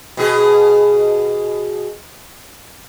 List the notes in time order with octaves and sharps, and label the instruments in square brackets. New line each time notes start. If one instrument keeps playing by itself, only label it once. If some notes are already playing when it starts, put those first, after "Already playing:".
[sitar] B2 G#4